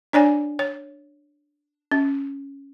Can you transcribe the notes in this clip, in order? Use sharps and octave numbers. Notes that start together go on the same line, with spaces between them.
D4 C#5 D5 G#5
C#5
C#4